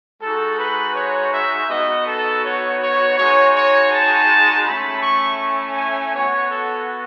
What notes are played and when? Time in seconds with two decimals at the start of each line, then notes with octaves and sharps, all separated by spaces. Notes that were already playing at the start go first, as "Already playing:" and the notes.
0.21 G#3 D#4 F#4 A4
0.58 B4
0.95 C#5
1.33 E5
1.69 B3 D#4 F#4 D#5
2.07 A4
2.44 C#5
2.81 C#5
3.17 G#3 D#4 F#4 C#5
3.55 C#5
3.92 A5
4.65 A3 C#4 E4 B5
5.03 C#6
5.77 G#5
6.14 B3 F#4 C#5
6.51 A4